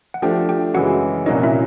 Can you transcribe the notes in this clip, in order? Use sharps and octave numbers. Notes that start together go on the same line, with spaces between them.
F#5
F3 A3 D4 G4 G5
G4 G5
F#2 C#3 E3 G#3 F#4 F#5
C2 A#2 F#3 A#3 C#4 D#4 D#5
E4 E5